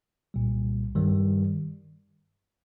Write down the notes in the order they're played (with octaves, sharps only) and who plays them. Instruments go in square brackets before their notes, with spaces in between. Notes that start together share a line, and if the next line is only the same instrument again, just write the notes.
[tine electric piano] C2 A#2 G3
G2 D#3 G3